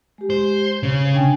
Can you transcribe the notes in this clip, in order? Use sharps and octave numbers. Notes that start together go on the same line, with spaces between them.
G#3 G4
C5
C#3 C#5
D4 G5 G#5